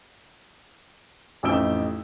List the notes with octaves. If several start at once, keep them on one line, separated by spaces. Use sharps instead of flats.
A1 F2 D#4 E6 D7 G7